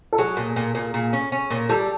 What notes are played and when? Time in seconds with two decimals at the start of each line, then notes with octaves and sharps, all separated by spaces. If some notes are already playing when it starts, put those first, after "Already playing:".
0.13 A4
0.18 F#3 G#4
0.37 A#2
0.56 A#2
0.75 A#2
0.94 A#2
1.13 C#4
1.32 C#4
1.50 A#2
1.69 G3 A4